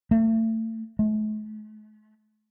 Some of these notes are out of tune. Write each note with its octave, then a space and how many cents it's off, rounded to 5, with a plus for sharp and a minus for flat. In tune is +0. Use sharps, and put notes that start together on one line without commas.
A3 +30
A3 -45